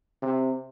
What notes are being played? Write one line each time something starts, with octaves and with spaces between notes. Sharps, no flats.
C3